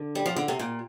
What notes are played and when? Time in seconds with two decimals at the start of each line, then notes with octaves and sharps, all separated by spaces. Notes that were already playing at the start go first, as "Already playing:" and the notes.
Already playing: D3
0.15 G3
0.26 F3
0.36 D3
0.48 C3
0.59 A#2